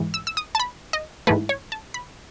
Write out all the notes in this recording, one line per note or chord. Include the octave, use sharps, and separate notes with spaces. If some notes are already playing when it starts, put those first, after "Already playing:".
Already playing: G#2 E3
E6
E6
D#6
A5
B5
D#5
G#2 E3 A3 B4
C#5
A5
B5